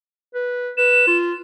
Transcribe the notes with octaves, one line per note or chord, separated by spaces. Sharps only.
B4
B4 E7
F4